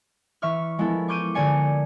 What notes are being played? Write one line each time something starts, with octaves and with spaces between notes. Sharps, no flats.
E3 E5 C#6 F6
F3 G#3 B3 E4 A4 A#4
C#6 D6 F6 G6 D7 D#7
D3 A#4 D5 G#5 C#7